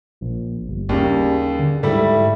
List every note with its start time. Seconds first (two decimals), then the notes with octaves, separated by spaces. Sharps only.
0.21 A#1
0.68 G1
0.89 D#2 C#3 G3
1.59 D3
1.83 G#2 G3 A3 E4